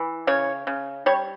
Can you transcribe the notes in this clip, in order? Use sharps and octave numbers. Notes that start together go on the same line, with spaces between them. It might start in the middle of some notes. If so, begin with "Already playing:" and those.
Already playing: E3
C#3 C#5
C#3
G3 C#5